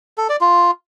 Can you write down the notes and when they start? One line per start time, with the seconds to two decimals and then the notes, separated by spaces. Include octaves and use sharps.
0.18 A4
0.29 D5
0.41 F4